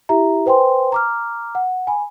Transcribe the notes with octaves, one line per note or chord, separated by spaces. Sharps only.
E4 G4 E5 A#5
B4 C5 G5 G#5 C6
A#5 D6 F6
F#5
G#5 B5